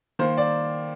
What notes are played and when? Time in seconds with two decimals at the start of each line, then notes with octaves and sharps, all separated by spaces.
0.19 D#3 A#3 C5
0.38 D5